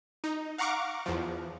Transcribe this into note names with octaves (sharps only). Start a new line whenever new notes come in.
D#4
F5 F#5 A#5 C#6 D6
E2 F3